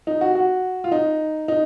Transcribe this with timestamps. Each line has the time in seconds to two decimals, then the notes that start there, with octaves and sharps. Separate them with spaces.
0.07 D#4
0.21 F#4
0.35 F#4
0.84 F4
0.92 D#4
1.48 D#4